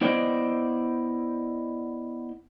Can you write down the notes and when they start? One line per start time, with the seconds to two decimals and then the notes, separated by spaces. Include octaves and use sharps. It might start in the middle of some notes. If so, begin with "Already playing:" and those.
0.01 B3 E4 C5 D5 D#5 G5